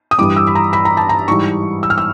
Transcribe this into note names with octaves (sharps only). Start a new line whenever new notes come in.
D#6
G2 E3 G3 D6
E6
B5
A#5
B5
A#5
A5
A#5
G#2 E3 G3 C#6
E6
F6
E6